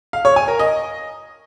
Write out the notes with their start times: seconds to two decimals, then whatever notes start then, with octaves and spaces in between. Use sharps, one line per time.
0.13 F5
0.25 C#5
0.36 G#5
0.48 A#4
0.59 D#5